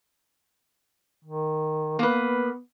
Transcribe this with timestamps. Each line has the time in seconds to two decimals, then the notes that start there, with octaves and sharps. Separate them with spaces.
1.25 D#3
1.99 A#3 B3 B4